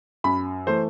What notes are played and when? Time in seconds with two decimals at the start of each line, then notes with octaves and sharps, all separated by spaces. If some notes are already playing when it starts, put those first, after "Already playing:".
0.24 F#2 B5
0.66 E3 A3 C5